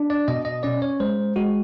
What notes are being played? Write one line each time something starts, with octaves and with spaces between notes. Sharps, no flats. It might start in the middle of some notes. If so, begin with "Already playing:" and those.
Already playing: D4
D5
B2 D#5
D#5
C#4 D5
C#5
G#3 C5
G#3 F#4